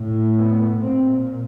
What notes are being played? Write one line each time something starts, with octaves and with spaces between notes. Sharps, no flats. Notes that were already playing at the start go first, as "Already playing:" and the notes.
Already playing: A2
B3
A#2 C4